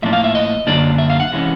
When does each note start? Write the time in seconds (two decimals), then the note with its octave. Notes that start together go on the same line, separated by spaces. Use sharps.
0.02 A2 F3 A#3 D4 E5
0.13 F5
0.24 E5
0.35 D#5
0.67 F#2 D3 F#3 A#3 D4 D5
0.98 E5
1.10 F5
1.20 F#5
1.32 C3 E3 G#3 C#4